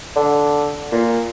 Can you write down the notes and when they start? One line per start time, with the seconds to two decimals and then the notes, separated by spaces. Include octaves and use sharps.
0.16 D3
0.92 A#2